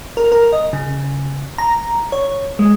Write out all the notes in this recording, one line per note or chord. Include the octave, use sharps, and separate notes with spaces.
A#4
A#4
D#5
C#3
A#5
C#5
G#3